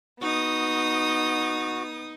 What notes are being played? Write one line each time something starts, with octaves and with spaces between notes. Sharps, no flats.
B3 D#4 F#4 D#6